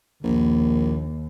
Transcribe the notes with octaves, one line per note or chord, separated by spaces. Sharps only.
A#1 D#2